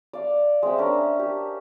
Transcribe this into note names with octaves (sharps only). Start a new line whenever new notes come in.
D5 F5
G#3 C4 E5 G5
C#4 D4 A#4
G4